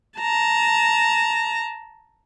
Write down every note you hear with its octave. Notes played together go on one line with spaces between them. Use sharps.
A5 A#5